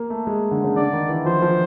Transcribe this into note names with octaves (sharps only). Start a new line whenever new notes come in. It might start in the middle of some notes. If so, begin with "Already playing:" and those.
Already playing: A#3
A3
G#3
D3
C#3
D3 D5
D#3
E3
F3 C5
F3